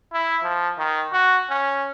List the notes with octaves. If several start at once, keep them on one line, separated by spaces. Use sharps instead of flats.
E4
F3
D#3
F#4
C#4